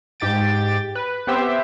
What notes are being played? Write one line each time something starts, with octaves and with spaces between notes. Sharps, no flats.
G#2 G4 G5 A6 D7
B4
B3 C4 G4 C5 E5